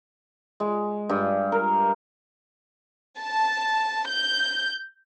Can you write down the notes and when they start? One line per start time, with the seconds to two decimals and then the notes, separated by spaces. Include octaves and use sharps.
0.60 G#3
1.09 G2
1.52 A#4
3.21 A5
4.09 G6